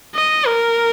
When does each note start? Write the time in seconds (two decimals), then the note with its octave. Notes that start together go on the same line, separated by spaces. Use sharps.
0.15 D#5
0.47 A#4